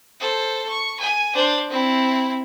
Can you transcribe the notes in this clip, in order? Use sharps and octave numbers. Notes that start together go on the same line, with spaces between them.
A4 C5
C#6
G#5
D4 C5
C4 E4